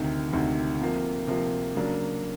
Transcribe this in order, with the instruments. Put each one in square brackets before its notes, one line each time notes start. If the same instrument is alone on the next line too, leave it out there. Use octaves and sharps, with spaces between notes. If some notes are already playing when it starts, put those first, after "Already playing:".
Already playing: [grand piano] D2 C3 D#3
D2 C3 D#3
C3 F3 A#3
C3 F3 A#3
C#3 F#3 A#3 D4